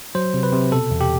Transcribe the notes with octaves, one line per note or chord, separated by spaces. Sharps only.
F#3 C5
C3
B4
C3
B2 A4
E2
G4